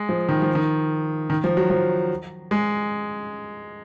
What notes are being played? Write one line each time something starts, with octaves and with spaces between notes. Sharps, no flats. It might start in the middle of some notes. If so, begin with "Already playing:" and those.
Already playing: G#3
F3
D#3
F3
D#3
D#3
F3
F#3
F3
G#3